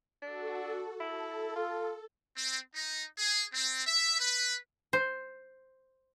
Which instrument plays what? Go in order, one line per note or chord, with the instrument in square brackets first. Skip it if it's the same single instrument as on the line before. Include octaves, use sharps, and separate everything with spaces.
[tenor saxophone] D4 [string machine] F#4 A4
[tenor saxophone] E4 [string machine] A4
[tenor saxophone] F4
[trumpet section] C4
D#4
G#4
C4
E5
B4
[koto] C5